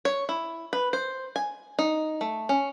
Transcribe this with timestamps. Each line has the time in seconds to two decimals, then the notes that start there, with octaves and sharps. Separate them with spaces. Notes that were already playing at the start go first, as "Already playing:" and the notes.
0.05 C#5
0.29 E4
0.73 B4
0.93 C5
1.36 G#5
1.79 D#4
2.21 A3
2.49 C#4